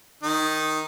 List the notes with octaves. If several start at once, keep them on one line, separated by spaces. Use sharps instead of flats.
D#3 D#4